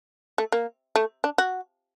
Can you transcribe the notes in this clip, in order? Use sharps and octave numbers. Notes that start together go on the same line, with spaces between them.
A3
A#3
A3
D4
F#4